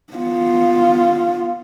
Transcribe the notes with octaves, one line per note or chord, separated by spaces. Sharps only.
B3 F4